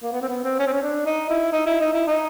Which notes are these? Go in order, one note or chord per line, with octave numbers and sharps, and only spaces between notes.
A#3
B3
C4
B3
C4
C#4
C4
C#4
D4
D#4
E4
D#4
E4
D#4
E4
D#4